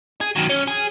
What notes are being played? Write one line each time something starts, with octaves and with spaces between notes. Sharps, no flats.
G#4
D#3 F#3
C#4
G#4